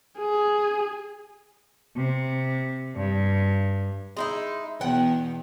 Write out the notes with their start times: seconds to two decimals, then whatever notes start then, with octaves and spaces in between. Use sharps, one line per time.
0.19 G#4
1.95 C3
2.94 G2
4.17 G#3 D#4 E4
4.81 E2 B2 F#5 G5